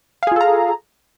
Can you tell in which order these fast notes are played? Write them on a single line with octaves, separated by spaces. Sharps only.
F5 G#4 F4 A4 A#5